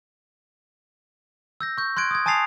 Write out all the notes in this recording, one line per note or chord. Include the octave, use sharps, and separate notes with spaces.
E6 G6 A#6
C#6 G6
C6 F#6 G#6 D7
D#6 G#6
G#5 A5 D#6 A6 C7 F7